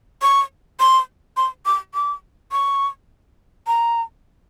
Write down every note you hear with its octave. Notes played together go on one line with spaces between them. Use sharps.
C#6
C6
C6
D6
D6
C#6
A#5